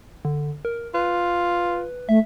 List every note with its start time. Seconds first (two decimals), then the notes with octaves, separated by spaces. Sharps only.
0.25 D3
0.65 A#4
0.94 F4 B4
2.09 A3 E5